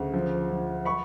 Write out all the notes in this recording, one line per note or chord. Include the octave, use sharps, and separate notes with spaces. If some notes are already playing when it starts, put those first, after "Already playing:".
Already playing: D2 C#3
F3
F3
B5 C#6